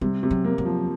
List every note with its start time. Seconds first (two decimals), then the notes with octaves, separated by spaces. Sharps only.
0.01 C3 G3
0.23 C3
0.31 F#3
0.45 A#3
0.58 F#3
0.66 F3